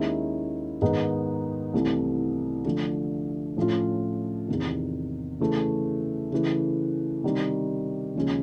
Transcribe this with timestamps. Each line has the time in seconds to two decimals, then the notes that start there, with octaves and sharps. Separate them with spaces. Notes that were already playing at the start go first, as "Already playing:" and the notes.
Already playing: D#2 D#3 G#3 C#4 E4
0.82 G#2 D#3 G#3 B3 D#4
1.74 C2 C3 E3 A3
2.65 D3 F3 A3 D4
3.57 A2 F3 A3 C#4 F4
4.48 E2 C3 D#3
5.40 C#3 E3 A3
6.32 C#3 E3 A3
7.24 C3 D#3 G3
8.15 D#2 C#3 F3 G#3 C#4